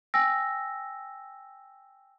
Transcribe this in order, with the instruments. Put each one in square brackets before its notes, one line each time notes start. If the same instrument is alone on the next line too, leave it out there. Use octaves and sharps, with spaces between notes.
[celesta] G5 G#5 E6 A#6